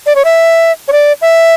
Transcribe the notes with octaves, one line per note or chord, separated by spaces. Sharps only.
D5
C#5
E5
C#5
D5
E5